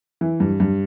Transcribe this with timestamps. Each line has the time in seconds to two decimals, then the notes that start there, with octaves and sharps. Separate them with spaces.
0.21 E3
0.40 G2
0.60 G2